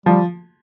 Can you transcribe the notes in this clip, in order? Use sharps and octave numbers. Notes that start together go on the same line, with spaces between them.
F3 G3